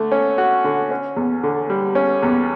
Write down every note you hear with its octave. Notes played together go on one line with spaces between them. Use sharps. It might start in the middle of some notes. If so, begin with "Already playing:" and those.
Already playing: D3 A3
C#4
F#4
D3
C#4
E2
D3
G3
C#4
E2